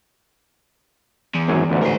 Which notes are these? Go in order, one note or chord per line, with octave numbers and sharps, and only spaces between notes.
E2
G#1 F#2 G#4
A1 D2 G#2
A#4 C5